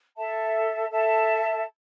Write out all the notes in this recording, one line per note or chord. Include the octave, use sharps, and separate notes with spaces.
A4 E5 A5
A4 E5 A5